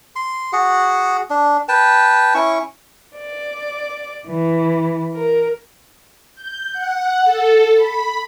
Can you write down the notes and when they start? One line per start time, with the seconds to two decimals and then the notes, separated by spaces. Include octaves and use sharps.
0.16 C6
0.53 F#4 G#4 F#5
1.30 D4
1.69 B4 G5 A5
2.34 C#4 E4 C#6
3.17 D5
4.26 E3
5.14 A#4
6.35 G6
6.73 F#5
7.24 A4
7.76 B5